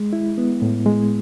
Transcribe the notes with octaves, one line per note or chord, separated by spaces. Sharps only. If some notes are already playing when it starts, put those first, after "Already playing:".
Already playing: G#3
E4
B3
A2
G#3